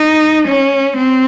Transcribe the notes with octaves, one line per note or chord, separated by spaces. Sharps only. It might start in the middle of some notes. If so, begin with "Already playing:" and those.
Already playing: D#4
C#4
C4